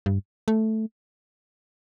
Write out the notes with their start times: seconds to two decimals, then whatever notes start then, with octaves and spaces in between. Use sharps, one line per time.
0.06 G2
0.48 A3